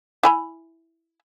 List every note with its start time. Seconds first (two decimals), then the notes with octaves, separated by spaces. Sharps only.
0.23 E4 G#5 B5